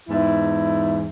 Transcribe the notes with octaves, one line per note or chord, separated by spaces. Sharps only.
E2 G#2 E4